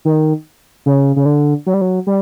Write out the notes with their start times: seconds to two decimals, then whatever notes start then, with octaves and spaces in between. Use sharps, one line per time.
0.05 D#3
0.86 C#3
1.16 C#3
1.26 D3
1.66 F#3
1.74 G3
1.81 F#3
2.07 G3